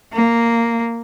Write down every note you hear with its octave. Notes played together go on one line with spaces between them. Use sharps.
A#3